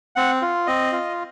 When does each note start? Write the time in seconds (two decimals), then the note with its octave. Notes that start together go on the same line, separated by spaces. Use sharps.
0.16 C4 F#5
0.42 F4
0.67 C4 D#5
0.92 F4